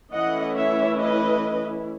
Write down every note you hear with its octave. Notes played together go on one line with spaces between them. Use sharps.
E3 A3 C#4 E4 D#5 F#5
C#5 E5
B4 D#5